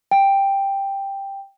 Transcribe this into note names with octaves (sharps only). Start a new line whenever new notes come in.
G5